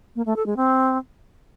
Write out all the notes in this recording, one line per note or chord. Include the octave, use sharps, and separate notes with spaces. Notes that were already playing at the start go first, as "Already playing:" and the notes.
A#3
A3
A4
G#3
C4